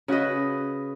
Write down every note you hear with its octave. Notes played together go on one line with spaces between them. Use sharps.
C#3 F#4 B4 D#5